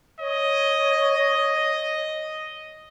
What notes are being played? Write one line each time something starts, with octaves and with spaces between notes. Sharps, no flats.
C#5 D#5